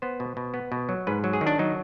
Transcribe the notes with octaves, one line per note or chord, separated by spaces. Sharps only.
B3 C5
B2
B2
B3
B2
F#3
G#2 B4
F#3
G#4
D#3
D4
F#3 D#4